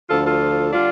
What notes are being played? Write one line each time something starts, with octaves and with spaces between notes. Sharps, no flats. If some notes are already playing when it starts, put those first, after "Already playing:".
D2 D3 F3 F4 A4
F4 A4
D3 G3 D4 F4